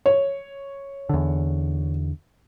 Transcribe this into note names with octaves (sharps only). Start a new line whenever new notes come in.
C#5
E2 D3